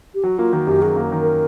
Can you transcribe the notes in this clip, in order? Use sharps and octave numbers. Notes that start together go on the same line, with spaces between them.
G4
F#3 F#4
A#3 F4
D#3 F#4
F#2 G4
F#3 G#4
A#3
D#3
A#4